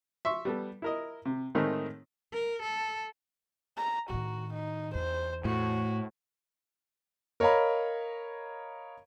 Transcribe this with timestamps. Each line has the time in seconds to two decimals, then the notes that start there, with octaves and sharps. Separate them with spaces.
0.25 E5 C6 C#6
0.45 G3 B3 A4
0.82 E4 A#4 D#5
1.25 C3
1.55 A2 D#3 G#3 A3 C4 D#4
2.33 A#4
2.62 A4
3.77 A#5
4.10 A2 D#3 F#4
4.53 D#4
4.95 E2 C5
5.45 A2 F#4
7.40 A#4 C#5 D#5 F5 A#5 B5